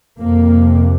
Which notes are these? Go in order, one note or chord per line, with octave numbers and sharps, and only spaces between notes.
F2 C3 A#3